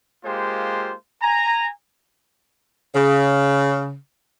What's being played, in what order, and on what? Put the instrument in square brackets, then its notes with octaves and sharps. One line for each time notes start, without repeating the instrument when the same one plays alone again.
[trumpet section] G#3 A#3 F4 G4 C5
G#5 A#5
[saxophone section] C#3